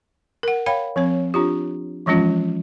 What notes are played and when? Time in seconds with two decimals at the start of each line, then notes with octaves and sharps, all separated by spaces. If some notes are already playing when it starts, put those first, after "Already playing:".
0.43 A#4 F#5
0.66 C#5 F5 G5 B5
0.96 F3 C4 C#5
1.34 D4 F4 G4
2.06 E3 F3 G#3 C#4 F4